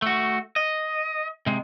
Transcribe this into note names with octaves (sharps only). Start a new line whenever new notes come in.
A3 F#4
D#5
C3 G#3